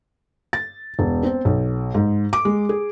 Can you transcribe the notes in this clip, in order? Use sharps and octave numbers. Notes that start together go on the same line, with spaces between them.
A6
E1
C4
B1
G#2
D6
G#3
G#4